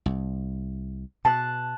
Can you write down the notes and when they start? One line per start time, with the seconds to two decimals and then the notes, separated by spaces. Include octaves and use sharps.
0.06 C2
1.25 B2 A5 F#6